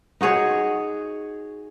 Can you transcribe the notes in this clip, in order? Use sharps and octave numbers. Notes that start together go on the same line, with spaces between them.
D#4 F#4 G#4 C#5